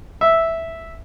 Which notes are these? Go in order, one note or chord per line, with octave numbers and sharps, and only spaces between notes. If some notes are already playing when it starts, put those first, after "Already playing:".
E5